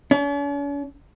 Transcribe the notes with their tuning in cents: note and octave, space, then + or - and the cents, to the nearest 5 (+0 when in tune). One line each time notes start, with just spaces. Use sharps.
C#4 +45